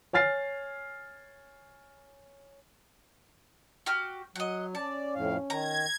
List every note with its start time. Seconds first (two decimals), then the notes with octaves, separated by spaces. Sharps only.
0.13 C#5 G#5 F6 A6 C7
3.86 F#4 G4 F6
4.36 F#3 D#5 F#5
4.75 C#4 D5 A5
5.15 F2 A2 F5
5.50 D#3 A#5 G#6